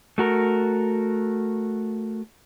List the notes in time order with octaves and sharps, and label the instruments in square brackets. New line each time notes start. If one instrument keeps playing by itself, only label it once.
[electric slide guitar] A3 F#4 A#4